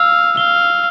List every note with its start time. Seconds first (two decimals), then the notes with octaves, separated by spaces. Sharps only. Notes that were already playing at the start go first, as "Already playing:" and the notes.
Already playing: F5 E6
0.37 F5 G7